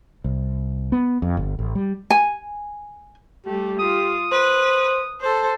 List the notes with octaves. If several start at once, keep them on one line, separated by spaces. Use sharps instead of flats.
C2
B3
F2
G1
A1
G3
G#5
G3 A3 G4
F4 D#6
B4 C5
A4 C5